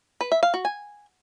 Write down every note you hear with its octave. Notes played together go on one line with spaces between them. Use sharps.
B4
E5
F5
F#4
G#5